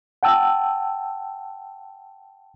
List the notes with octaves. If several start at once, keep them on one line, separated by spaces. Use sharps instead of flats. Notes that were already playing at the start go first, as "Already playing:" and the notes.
F#5 G5 A5 E6